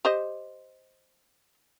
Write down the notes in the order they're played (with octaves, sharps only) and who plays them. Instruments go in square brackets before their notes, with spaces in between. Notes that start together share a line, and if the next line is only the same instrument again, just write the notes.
[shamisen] G4 C5 D#5